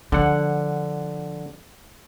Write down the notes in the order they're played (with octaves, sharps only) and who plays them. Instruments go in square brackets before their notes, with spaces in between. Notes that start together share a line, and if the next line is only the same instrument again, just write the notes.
[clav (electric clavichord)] D3 F#5 [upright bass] F3